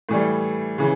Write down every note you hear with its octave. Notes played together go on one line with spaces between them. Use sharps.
A2 E3 G3
C#3 E3